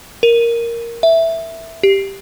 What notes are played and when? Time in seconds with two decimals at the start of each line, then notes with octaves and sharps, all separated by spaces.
0.23 A#4
1.03 E5
1.83 G4